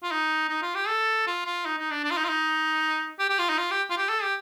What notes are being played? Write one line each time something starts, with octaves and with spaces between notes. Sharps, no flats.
F4
D#4
D#4
F4
G4
A4
F4
F4
D#4
D#4
D4
D4
F4
D#4
F4
D#4
G4
G4
F4
D#4
F4
G4
F4
G4
A4
G4